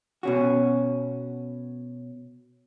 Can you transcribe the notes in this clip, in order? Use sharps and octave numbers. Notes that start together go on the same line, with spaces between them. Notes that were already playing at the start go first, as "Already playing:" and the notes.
B2 C#4 F#4